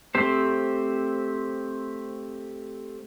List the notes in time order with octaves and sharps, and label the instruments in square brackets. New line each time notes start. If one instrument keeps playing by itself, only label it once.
[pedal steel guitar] A3 C4 G4 C5